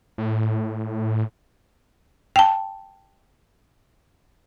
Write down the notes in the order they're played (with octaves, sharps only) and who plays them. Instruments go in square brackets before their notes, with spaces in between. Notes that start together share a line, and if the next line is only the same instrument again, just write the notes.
[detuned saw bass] A2
[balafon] G5 A5